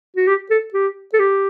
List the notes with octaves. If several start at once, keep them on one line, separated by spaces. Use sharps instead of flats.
F#4
G4
A4
G4
A4
G4